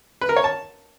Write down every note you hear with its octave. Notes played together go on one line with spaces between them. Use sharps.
B4
A#4
C#5
A5